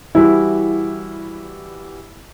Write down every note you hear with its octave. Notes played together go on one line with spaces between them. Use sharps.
E3 G3 E4 F#4